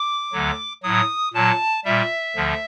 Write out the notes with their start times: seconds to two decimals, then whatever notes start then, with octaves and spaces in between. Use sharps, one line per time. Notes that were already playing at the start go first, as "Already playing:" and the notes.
Already playing: D6
0.33 D2 D3 F#3
0.83 A2 F#3 D#6
1.33 A#2 F#3 A5
1.85 A#2 G3 E5
2.36 D2 D3 F3